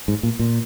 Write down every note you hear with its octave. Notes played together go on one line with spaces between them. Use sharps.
G#2
A#2
A#2